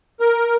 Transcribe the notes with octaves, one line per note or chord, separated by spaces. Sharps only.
A#4